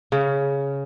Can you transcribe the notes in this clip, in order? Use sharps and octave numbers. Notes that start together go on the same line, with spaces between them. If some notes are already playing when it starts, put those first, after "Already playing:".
C#3